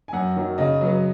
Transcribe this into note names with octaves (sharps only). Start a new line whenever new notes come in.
G#5
F#2 F#5
D#3 F#3
C#3 D#5
F#3 B3